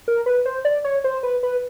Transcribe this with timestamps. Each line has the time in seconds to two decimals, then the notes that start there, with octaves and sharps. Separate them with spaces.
0.08 A#4
0.26 B4
0.46 C5
0.65 D5
0.84 C#5
1.04 C5
1.23 B4
1.43 B4